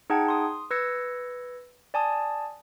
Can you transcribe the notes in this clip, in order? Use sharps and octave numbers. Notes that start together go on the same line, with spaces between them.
D#4 G#4 F#5 G5 A5 G#6
C6 D#6
B4 E6 G#6 A#6 C#7
D5 G#5 A5 D#6